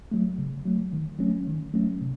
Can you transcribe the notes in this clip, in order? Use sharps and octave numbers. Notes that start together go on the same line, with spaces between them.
F#3 A3
C#3
F#3 A3
D#3
F#3 A3 C#4
D#3
F#3 A3 C#4
C3